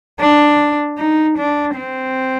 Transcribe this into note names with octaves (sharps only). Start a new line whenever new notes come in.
D4
D#4
D4
C4